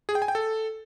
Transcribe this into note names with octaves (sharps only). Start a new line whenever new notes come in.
G#4
G5
G#5
G5
A4